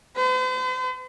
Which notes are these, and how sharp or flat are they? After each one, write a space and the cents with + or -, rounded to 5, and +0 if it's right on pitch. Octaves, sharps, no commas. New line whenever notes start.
C5 -45